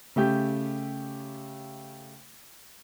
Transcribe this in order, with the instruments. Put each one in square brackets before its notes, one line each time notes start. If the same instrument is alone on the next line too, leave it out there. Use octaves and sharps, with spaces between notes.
[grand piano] C#3 A3 G4 G6